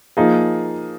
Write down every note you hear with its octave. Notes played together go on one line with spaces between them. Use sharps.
F3 A#3 D#4 G#4